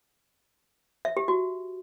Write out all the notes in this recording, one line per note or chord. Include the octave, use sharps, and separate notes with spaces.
E5
G4
F#4